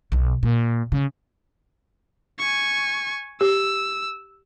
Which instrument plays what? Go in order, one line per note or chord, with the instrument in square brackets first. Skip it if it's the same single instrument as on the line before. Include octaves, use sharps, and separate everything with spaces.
[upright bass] B1 B2
A#2
C#3
[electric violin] G#5 C#6
[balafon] G4 [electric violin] E6